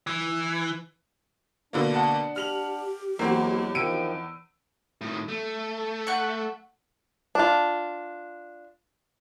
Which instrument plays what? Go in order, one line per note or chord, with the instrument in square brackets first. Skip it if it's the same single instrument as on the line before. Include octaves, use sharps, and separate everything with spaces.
[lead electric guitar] E3
[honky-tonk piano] B2 D3 A#3 [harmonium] D4
[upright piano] F#5 A5
[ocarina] G4 [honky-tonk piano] F6 F7 F#7
[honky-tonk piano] E2 [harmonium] F#3 G#3 [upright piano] A#3 C4 F#4
[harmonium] D#3 F3 C4 [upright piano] E6 D7 D#7
[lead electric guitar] A2 D#3
A3
[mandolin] F#5 C#6
[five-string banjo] D4 F4